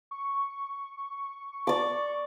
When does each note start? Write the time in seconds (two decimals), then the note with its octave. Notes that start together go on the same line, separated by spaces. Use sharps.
0.11 C#6
1.67 D5 D6